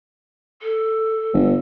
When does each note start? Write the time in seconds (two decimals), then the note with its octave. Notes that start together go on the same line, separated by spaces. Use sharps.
0.62 A4
1.33 G1